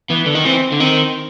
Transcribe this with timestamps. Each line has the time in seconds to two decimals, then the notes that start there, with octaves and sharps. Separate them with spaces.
0.09 E3 B3
0.26 D3
0.35 D#3
0.44 E3 C4
0.72 D3
0.79 D#3 C4